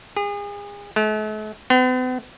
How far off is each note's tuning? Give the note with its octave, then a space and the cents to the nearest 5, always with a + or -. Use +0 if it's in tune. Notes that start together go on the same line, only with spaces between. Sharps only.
G#4 -35
A3 -45
B3 +45